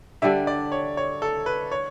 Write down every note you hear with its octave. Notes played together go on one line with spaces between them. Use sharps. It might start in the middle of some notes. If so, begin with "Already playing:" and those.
D3 G3 D4 E5
D5
C#5
C#5
A4
B4
C#5